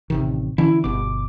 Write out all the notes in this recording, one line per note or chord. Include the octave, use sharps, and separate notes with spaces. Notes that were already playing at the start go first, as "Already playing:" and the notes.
A1 C3 D#3
D3 E3 C#4 E4
G1 B2 D6